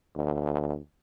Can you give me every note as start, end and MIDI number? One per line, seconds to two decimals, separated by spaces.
0.15 0.77 38